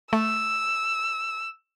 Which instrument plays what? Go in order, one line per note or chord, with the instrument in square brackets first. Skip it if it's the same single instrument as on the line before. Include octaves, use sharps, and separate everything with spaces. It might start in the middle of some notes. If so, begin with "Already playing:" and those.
[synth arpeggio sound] A3 [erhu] E6